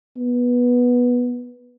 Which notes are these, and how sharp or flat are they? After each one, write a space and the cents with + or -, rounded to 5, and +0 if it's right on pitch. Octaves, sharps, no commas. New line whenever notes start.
B3 -10